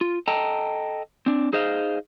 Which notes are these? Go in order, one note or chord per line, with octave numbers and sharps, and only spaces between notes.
F4
A4 D#5 G5 A5 A#5
C4 D4
D#4 G#4 C5 D#5 F5